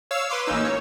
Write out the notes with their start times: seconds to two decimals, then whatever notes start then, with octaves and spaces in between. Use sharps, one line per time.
0.11 C#5 F5 E6
0.30 B4 C6 D6
0.46 A1 A#3 C#4 D#4 E6
0.65 C#5